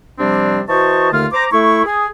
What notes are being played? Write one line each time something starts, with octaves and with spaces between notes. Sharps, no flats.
C3 F3 G3 C4 D4
E3 F#4 C5 D#5 A5 C#6
D#2 D3 A3 F4 F6
C5 A#5 D6
A3 E4 C#6
G#4